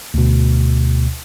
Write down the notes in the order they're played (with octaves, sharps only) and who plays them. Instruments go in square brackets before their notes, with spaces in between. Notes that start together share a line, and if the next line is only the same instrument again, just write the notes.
[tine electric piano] D2 B2